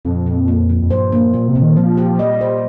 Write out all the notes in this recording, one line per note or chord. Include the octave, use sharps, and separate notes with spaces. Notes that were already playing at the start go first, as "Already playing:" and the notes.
F2 A#2
A#2
A#3
F3
F2
G2 C5
A#3
A#2 G3
C3
A#2
D#3
F3 C4
G4
G3 D#5
C5